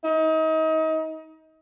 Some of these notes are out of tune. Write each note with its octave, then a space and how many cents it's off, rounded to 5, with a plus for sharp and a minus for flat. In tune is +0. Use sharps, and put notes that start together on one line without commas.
D#4 +30